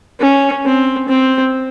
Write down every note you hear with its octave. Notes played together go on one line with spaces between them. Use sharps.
C#4
C4
C4